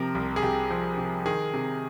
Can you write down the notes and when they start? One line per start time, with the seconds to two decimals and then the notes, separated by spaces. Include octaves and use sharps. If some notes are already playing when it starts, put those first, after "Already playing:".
Already playing: C3 F3 A#4
0.15 C2
0.36 G#4
0.42 C2 G4
0.70 F3
0.98 C3
1.26 D#3 G#4
1.54 C3